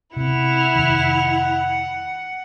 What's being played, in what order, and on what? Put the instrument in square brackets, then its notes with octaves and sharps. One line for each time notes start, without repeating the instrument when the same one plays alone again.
[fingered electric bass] C3 B3 C4 [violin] E4 F7 [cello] F#5
[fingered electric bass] F2 C3 D#3